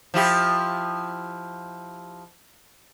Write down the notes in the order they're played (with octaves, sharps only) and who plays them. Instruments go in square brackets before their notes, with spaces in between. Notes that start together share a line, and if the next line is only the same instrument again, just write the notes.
[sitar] F3 E4 G4